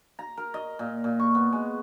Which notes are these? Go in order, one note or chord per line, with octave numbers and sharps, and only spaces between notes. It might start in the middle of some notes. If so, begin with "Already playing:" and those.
A#5
A#4
D#5
A#2
A#2
C#6
B3
G#3